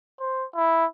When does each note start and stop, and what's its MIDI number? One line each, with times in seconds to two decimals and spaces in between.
0.20 0.45 72
0.55 0.86 64